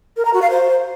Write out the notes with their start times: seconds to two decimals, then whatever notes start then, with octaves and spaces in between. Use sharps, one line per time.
0.17 A#4
0.25 A#5
0.33 F#4
0.42 F5
0.50 C5